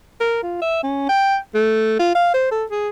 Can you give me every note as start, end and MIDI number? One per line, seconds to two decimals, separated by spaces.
0.20 0.41 70
0.43 0.59 65
0.62 0.82 76
0.83 1.06 61
1.09 1.37 79
1.55 1.97 57
1.99 2.12 65
2.15 2.33 77
2.34 2.47 72
2.51 2.65 69
2.71 2.89 68